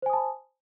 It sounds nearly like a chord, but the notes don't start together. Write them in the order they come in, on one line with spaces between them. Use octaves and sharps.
C5 G#5 D#6 A5 B5